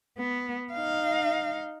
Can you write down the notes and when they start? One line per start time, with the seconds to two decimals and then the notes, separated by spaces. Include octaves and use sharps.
0.18 B3
0.72 D#4 F5